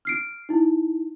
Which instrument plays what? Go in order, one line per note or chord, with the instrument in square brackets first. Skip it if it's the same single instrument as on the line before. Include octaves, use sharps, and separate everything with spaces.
[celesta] F6 C7 D7
D#4 E4